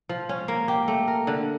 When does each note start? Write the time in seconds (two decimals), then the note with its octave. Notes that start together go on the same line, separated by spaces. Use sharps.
0.09 F3
0.29 C#4
0.48 A#3
0.68 G4
0.88 A3
1.08 A#4
1.27 D3